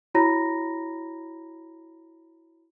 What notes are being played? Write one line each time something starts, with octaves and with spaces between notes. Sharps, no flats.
E4 F#4 C#5 A#5 B5 A#6